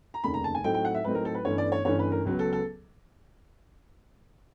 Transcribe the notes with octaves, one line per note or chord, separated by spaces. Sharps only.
A#5
F1 D#2 C#3 B5
A#5
A5
G#5
A2 F#3 A3 C4 D#4 G5
G5
F#5
E5
A2 F#3 A3 C4 D#4 B4
A#4
A4
B4
G1 G2 E3 A3 C#4 C#5
D5
C#5
G1 G2 E3 A3 C#4 C#5
B4
A#4
C#2 C#3 F#3 B3
A4
A4